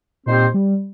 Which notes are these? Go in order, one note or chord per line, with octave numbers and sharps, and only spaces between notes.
A#2 D#3 C4 G4 C5
G3